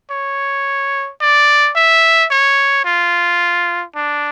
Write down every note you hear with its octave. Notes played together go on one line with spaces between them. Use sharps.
C#5
D5
E5
C#5
F4
D4